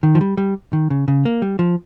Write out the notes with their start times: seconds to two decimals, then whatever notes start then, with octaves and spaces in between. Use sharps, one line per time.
0.03 D#3
0.15 F3
0.21 G3
0.37 G3
0.73 D#3
0.90 C#3
1.08 C#3
1.25 A#3
1.42 G3
1.59 F3